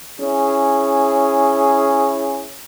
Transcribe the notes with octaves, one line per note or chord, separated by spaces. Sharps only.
C#4 E4 G#4